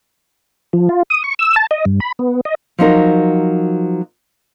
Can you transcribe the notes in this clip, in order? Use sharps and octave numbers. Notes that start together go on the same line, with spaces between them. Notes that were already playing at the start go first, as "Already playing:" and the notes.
F3
F4
D#6
C#6
E6
A5
D#5
G2
B5
B3
D#5
F3 F#3 D#4 A#4